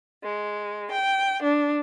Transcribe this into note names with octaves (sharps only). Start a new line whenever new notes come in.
G#3
G5
D4